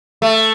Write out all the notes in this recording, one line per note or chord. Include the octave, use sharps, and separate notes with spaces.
A3